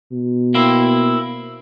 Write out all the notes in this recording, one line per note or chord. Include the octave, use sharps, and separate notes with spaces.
B2
A#3 C4 E4